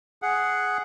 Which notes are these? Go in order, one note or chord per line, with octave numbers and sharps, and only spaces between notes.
G#4 F#5